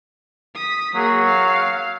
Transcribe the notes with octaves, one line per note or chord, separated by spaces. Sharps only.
D#6 B6
F#3 A#3 G#4
F5